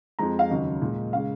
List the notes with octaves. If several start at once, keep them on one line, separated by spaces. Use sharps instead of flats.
F2 F3 G#3 A#5
F5
D#2 C#3 F#3 D#5
A#2 G#3
C#3 G#3 F5